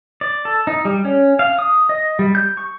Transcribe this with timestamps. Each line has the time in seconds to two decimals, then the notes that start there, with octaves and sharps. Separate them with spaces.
0.21 D5
0.45 A4
0.67 D#4
0.85 G3
1.05 C#4
1.39 F5
1.59 D#6
1.89 D#5
2.19 G3
2.35 G6
2.57 C#6